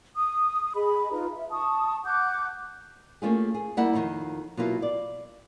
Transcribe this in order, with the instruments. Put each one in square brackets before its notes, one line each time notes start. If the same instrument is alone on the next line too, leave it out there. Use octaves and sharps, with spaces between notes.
[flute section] D#6
G#4 D#5 B5
D#4 F4 B4 A#5
E5
A5 C#6 D#6
F#5 D6 F#6 G6
[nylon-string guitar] A3 A#3 C#4 F4 G4 G#4
G#4
G3 A#3 E4 F#5
F2 D#3 D#4 F4 C#5
B2 F#3 A#3 E4 F4
D5